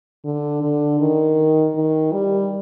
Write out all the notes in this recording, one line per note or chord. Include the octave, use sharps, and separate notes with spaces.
D3
D3
D#3
D#3
G3